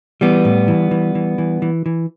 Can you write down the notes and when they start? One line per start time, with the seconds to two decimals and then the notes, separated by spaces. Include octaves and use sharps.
0.21 E3 G3 B3
0.45 A2
0.68 E3
0.91 E3
1.15 E3
1.38 E3
1.62 E3
1.86 E3